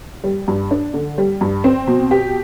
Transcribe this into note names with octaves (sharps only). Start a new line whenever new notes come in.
G3
G2
D4
D3
G3
G2
C4
B2
G4